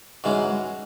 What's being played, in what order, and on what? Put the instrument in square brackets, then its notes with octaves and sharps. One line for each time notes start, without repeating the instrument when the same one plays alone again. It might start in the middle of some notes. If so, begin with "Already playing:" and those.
[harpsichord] G#2 E3 G#3 C#4 F#4